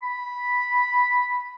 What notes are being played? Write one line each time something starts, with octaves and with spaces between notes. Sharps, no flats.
B5